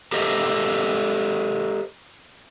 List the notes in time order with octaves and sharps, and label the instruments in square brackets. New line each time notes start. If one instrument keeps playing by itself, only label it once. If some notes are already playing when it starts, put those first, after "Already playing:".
[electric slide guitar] G4 A4 A#4 C5 D#5 E5